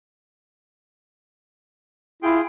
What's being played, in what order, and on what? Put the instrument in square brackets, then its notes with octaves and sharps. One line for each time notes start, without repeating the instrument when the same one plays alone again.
[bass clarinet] E4 [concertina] F4 G#4 G5